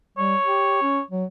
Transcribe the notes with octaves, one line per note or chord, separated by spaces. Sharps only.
G3 C#5
G4
C#4
F#3